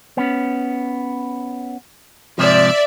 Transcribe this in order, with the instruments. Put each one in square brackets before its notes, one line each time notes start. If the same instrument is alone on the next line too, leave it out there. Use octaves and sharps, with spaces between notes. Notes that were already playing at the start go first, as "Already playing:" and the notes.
[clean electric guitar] B3 C#4
[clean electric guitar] G#2 C3 F3 [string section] D5 E5